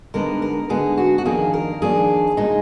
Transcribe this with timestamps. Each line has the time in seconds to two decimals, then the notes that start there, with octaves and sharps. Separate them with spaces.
0.14 D3 G#3 B3 D#4 A#4
0.42 A#4
0.70 D3 G#3 B3 D#4 G#4
0.97 F#4
1.18 F#4
1.25 F2 D#3 A#3 D4 G#4
1.54 A#4
1.82 F2 D#3 A#3 D4 G#4
2.37 A#2 G#3 D#4